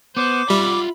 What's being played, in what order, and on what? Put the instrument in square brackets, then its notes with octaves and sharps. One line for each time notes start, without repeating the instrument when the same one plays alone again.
[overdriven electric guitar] B3 [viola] C5 [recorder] D6
[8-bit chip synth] G3 [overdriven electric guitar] F4 E5 [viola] B5